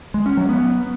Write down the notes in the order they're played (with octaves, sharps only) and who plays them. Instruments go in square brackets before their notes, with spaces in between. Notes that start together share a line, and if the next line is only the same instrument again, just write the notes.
[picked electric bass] G#3
C#4
F#3
B3